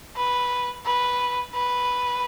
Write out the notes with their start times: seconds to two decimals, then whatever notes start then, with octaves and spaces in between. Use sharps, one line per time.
0.16 B4
0.86 B4
1.55 B4